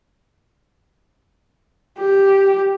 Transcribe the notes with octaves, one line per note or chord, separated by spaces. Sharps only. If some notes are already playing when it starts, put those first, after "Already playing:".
G4